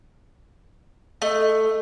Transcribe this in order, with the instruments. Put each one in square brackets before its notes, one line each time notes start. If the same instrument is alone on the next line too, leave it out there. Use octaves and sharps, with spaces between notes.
[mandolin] A3 [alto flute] D#5
[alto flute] A4